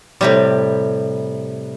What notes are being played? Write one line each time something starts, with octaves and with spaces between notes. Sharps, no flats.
A2 C3 G3